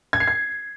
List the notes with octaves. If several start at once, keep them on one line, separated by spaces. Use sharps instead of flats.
G#6
C7
G#6